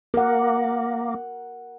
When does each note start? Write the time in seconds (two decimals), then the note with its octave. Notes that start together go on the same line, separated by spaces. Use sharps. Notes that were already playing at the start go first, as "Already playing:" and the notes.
0.14 A#3 A#4 F#5